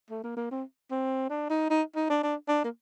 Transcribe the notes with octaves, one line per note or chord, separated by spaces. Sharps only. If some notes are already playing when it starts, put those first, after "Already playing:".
A3
A#3
A#3
C4
C4
D4
D#4
D#4
D#4
D4
D4
D4
A#3